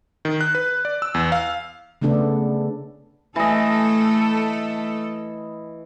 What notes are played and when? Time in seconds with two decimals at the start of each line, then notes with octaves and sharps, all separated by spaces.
0.25 D#3
0.41 F#6
0.55 B4
0.85 D5
1.02 E6
1.14 E2
1.32 F5
2.02 C#3 A3 B3 D4 A4
3.36 E3 A3 A4 D#5